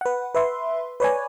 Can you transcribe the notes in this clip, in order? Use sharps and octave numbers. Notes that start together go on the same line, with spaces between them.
B4 F#5
B4 E5 C6
B4 C#5 D5 G#5